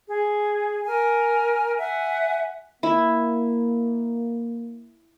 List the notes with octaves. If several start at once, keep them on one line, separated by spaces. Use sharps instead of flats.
G#4
A#4 G#5
E5 F#5 G#5
A#3 E4